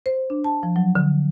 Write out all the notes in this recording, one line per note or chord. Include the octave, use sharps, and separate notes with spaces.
C5
D4
A5
F3
F#3
D3